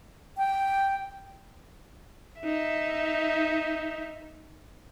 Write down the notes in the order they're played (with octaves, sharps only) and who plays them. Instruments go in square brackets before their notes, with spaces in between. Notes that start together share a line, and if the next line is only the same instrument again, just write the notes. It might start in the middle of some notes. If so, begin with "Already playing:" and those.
[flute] G5
[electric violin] D#4 E5